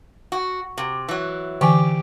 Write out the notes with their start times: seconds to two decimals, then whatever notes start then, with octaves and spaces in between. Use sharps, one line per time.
0.32 F#4
0.78 C3
1.08 E3 F#3
1.61 D3 E3 G4 G#5